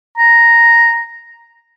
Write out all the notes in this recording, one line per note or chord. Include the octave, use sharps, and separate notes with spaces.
A#5